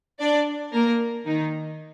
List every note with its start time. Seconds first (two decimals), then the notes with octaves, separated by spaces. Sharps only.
0.19 D4 D5
0.73 A#3 A#4
1.26 D#3 D#4